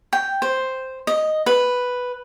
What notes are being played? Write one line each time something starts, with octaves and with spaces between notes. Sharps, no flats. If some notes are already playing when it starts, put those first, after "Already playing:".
G5
C5
D#5
B4